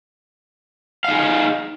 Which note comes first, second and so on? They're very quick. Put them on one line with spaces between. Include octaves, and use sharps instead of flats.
F5 D#4 G#4